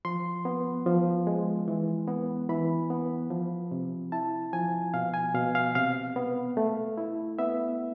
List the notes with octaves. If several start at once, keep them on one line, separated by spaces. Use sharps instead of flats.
F3 C6
B3
F3
G#3
E3
B3
E3 B5
B3
F3
C3
E4 A5
F3 G#5
B2 F5
G#5
B2 F5
F5
C3 F5
B3
A3
E4
B3 E5